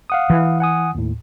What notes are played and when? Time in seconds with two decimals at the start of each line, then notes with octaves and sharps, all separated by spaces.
0.10 F5 F#5 D#6
0.30 E3
0.60 F#5 G#5 D#6
0.95 D#2 A2